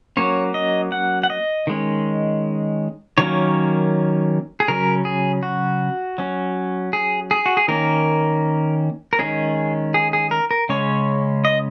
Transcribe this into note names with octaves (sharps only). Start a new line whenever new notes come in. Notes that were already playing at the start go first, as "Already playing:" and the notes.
F#3 A#3 C#4 C#5
D#5
F#5
F#5
D#5
D#3 G#3 C#4
D#3 F#3 A#3 C#4 C#5
G#4
C#3 F#3 C#4 A#4
G#4
F#4
F#3 C#4
G#4
G#4
F#4
G#4
D#3 A#3 C#4 A#4
A#4
D#3 G#3 C#4 G#4
G#4
G#4
A#4
A#4
C#3 G#3 C#4 C#5
D#5